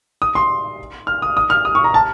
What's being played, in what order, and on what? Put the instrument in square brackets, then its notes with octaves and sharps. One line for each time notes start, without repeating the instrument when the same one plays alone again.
[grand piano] D#6
C6
F6
D#6
D#6
F6
D#6
C#6
A#5
A5